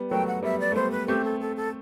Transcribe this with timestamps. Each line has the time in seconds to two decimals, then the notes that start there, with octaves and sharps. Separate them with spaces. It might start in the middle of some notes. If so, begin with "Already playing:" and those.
Already playing: G3 B3
0.11 F#3 A3 G5
0.27 F#5
0.43 G3 B3 E5
0.60 D5
0.72 A3
0.75 G3 B3 C5
0.91 B4
1.08 A3 C4 G4
1.25 A4
1.40 A4
1.56 A4